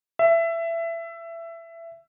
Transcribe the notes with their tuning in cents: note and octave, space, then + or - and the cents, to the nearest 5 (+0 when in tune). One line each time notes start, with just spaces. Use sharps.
E5 +20